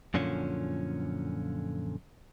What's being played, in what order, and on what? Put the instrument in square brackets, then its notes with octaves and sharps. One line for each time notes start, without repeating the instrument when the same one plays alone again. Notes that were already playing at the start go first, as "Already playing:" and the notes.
[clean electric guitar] F#2 A#2 D3 F3 C#4